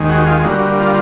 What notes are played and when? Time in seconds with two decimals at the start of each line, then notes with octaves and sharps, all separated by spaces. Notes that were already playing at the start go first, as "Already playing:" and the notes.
Already playing: D#2 D#3 G#3
0.10 F#4
0.27 F4
0.44 D3 G3 A#3 F#4
0.80 F4